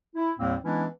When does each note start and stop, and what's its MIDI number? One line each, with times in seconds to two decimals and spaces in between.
0.16 0.30 64
0.39 0.55 39
0.39 0.55 45
0.39 0.55 55
0.39 0.55 58
0.39 0.55 60
0.64 0.85 52
0.64 0.85 56
0.64 0.85 59
0.64 0.85 61
0.64 0.85 62
0.64 0.85 64